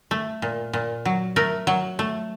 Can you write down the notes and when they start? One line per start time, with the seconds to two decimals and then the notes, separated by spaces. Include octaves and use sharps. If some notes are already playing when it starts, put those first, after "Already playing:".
0.11 A3
0.42 A#2
0.73 A#2
1.05 F#3
1.36 A3 A#4
1.67 F#3
1.99 A3